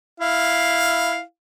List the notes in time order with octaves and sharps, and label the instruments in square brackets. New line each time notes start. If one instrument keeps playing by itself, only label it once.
[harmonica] E4 F5